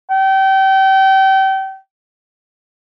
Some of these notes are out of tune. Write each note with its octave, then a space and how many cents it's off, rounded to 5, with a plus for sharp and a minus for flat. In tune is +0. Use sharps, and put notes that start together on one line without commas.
G5 -30